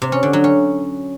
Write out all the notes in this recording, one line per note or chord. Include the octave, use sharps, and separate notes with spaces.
C3
C#4
D3
F#3
C#4